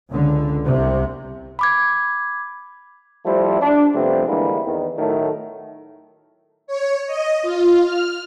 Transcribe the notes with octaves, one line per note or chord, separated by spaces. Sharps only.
C#2 D3
C2 C3
B5 D6 G#6
F3 G3 A3 E4 C5
D4
C3 F3 G3 A3 B3 C4
D3 E3 G3 G#3 A#3 E4
E2 D#3
A2 D#3 F#3 A3
C#5
D#5
F4
F6